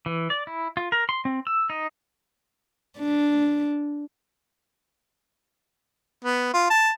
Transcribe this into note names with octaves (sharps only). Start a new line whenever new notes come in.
E3
D5
E4
F4
A#4
C6
C4
E6
D#4
D4
B3
F4
A5